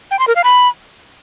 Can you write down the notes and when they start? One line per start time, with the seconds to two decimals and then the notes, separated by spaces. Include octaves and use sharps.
0.11 G5
0.19 C6
0.27 A#4
0.36 F5
0.44 B5